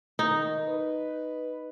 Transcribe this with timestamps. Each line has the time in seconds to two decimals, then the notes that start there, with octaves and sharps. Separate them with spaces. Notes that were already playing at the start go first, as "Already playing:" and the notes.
0.19 D#3 D#4
0.68 B4